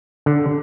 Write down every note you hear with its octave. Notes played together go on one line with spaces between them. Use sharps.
D3